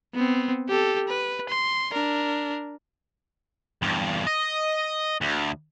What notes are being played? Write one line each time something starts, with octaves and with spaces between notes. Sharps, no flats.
B3 C4
G4 A4
B4
C6
D4 A#4
E2 G2
D#5
D2